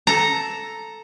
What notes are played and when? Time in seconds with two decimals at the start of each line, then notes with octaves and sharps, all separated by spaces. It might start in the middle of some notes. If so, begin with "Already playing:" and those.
0.07 A4 A#5